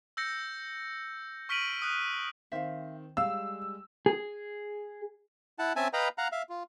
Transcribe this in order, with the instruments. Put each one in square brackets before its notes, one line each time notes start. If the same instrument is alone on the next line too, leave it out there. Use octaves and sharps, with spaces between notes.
[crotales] E6 G6 A#6 C#7
C#6 F6 B6 D7 D#7 F#7
D#6 F#6
[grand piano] D#3 C4 C5 [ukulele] E5 F5
[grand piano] G3 G#3 [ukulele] F5 [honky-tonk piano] E6
[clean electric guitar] G#4
[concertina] E4 F#5 A5
C4 C#4 E5 G#5 A5
B4 D#5 F5 G5 A#5 B5
F5 F#5 A#5
E5 F5
F4